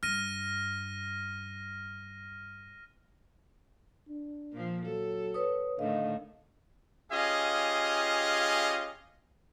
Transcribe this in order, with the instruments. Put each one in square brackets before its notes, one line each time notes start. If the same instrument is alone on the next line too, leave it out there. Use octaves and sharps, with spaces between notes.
[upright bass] G2 [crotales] F6 A#6 D#7
[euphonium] D4
[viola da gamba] A#2 F3
[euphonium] F#3 [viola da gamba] A4
[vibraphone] B4 C#5 D#6
[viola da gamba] A2 D#3 A3 [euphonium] D3 [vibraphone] D#5 F5
[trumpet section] C#4 F4 G4 G#4 D#5 F5